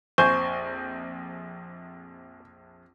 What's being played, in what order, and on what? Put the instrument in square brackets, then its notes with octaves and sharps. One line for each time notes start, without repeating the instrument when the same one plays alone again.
[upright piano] A#1 F2 G#5 [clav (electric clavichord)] C5 [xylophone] C#6 [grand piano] G6